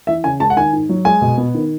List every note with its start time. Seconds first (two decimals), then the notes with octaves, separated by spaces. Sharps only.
0.07 E3 E5
0.24 C#3 G#5
0.40 G#3 A5
0.50 F#5
0.57 D#3 G#5
0.73 G#2
0.89 F#3
1.05 G#3 G#5
1.21 B2
1.38 B3
1.54 D#3